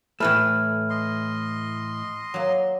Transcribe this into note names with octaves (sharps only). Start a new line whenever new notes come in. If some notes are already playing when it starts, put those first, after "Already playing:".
A2 E3 A3 B5 F6
D#5 C6
F#3 A#3